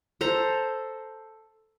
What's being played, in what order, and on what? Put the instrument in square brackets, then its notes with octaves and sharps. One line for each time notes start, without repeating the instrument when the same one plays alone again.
[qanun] A4 C5 A#5